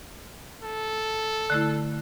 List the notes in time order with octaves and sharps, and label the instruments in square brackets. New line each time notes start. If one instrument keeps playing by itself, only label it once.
[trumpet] A4
[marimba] D3 A3 E4